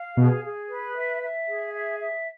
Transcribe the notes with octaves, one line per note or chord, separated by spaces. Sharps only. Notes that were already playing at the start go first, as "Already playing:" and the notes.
Already playing: F5
B2 G#4
G#4
B4
E5
E5
G#4
E5
E5